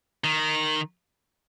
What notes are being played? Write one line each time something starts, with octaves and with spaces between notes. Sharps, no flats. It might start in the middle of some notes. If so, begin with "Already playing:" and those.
D#3